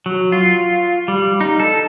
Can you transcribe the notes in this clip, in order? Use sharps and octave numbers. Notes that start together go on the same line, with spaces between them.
F#3
F4
G3
D#4
A4